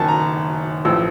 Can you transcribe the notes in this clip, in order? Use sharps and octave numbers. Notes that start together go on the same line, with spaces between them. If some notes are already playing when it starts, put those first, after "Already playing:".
Already playing: F#1 F#2 D#3 G#5 A5
A#5
A1 A2 F3 E6